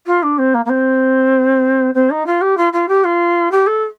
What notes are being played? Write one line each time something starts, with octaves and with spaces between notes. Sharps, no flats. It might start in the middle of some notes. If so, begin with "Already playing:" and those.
F4
D4
C4
A#3
A#3
C4
C4
D#4
F4
G4
F4
F4
G4
F4
G4
A4